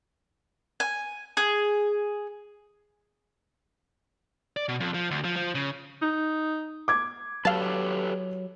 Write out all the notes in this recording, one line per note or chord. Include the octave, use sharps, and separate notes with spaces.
G#5
G#4
D5
B2
F2
F3
D2
F3
F3
C#3
D#4
D6 G#6
F#3 G4 A4 B4 F5 A5